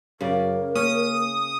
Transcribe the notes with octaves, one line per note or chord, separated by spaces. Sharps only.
F#2 C#3 A#4 D5
A#3 C#4 D#6